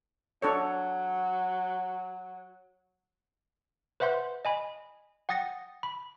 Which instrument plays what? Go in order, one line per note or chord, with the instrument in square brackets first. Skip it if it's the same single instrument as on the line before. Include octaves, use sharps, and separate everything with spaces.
[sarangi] F#3 [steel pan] D4 A4 C#5
[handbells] B4 C5 E5 F#5 C6 G6
D#5 G#5 B5
F#5 G5 D#6 A6 A#6 C#7
B5